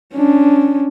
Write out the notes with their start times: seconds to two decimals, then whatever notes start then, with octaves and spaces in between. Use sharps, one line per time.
0.14 C#4 D4